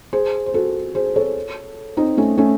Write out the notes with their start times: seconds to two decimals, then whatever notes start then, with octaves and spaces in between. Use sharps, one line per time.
0.13 G#4 C5
0.46 C5
0.54 F#4 A4
0.95 G#4 C5
1.16 A4 C#5
1.97 C4 D#4
2.17 A3 C#4
2.38 A3 C#4